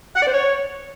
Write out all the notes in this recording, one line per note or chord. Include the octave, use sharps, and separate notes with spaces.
F#5
D5
C5
C#5